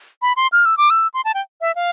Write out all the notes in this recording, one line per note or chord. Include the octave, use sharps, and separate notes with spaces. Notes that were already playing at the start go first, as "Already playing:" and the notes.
B5
C6
F6
E6
D6
E6
C6
A5
G5
E5
F5